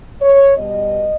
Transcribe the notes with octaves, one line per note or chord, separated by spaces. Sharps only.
C#5
B2 G3 D#5